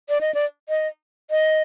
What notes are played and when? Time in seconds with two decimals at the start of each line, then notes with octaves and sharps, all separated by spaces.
0.09 D5
0.21 D#5
0.34 D5
0.69 D#5
1.31 D#5